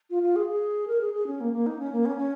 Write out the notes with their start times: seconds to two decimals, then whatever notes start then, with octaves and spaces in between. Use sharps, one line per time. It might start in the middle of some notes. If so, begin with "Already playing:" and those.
0.10 F4
0.23 F4
0.36 G#4
0.48 G#4
0.87 A#4
1.01 G#4
1.14 G#4
1.27 C#4
1.41 A#3
1.53 A#3
1.66 D#4
1.79 C#4
1.92 A#3
2.06 C#4
2.18 C#4